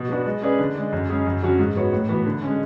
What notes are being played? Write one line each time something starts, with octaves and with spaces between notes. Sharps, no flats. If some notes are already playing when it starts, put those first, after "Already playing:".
Already playing: B2
F#3 B3 D4 F#4
G#3
C#4 G#4 B4 D5
D3
G#3 D4
F#2
C#3 G#3 C#4 G#4
F#2
D3 F#3 C#4 F#4
G#2
F#3 B3 F#4 C#5
A2
E3 B3 F#4
D3
G#3 C#4